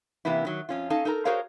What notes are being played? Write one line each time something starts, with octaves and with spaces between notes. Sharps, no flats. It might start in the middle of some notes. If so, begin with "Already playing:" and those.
C3 E3 A#3 B3 E4
D#3 F#3
F2 C#4 F4
C#4 D#4 A4 F5 A5
D#4 A4 A#4 A#5
F#4 G#4 A#4 C5 C#5 F5